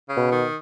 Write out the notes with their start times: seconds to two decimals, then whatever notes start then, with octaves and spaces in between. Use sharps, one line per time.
0.09 C#3
0.17 B2
0.31 D#3